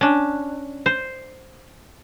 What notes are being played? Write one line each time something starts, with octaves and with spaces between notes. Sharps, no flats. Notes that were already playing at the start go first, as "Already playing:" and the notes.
C#4 D4
C5